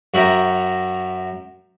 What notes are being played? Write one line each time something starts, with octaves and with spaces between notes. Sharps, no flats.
F#2 F#4 E5 G5 A#5